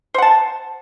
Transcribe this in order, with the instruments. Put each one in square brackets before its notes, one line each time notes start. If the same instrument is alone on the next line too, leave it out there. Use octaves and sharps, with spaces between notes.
[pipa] C5
F#5
A5